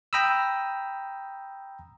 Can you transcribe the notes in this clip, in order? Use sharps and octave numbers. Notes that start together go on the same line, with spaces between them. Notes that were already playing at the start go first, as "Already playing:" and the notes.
G5 A#5 B5 D#6 E6